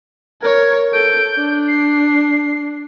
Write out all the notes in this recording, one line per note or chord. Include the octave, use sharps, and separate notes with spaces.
A#4 C#5 G#6
A4 G6 D7
D4
C7